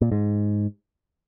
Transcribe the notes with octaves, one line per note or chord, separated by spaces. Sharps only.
A#2
G#2